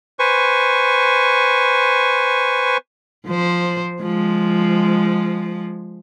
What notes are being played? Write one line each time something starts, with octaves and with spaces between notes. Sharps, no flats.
B4 C5 G#5 C#6
F3 C5
F3 G#3